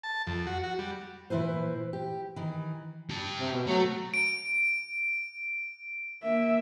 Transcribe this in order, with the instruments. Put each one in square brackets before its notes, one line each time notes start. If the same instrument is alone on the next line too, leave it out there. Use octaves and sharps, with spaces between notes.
[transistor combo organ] A5
F2
F#4
F#4
G3
[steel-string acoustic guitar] A#2 E3 E4 B4 C5
G4
D#3 E3
[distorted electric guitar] G4 A5
[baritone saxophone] C3
B2
[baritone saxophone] F#3 [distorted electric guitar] A3
[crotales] D7
[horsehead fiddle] A#3 E5